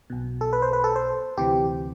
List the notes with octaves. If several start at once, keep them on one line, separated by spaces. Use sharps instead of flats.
B1 B2
A4
B4
C5
B4
A4
C5
D2 C3 E3 G4